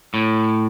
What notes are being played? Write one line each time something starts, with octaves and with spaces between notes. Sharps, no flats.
A2